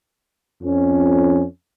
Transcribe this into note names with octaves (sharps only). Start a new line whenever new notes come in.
F2 C#4